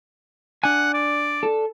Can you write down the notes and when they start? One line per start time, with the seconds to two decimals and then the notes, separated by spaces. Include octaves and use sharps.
0.64 D4 F#5 G#5
0.94 D5
1.43 A4